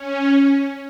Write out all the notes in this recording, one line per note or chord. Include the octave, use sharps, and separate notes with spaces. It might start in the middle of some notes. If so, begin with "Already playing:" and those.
Already playing: C#4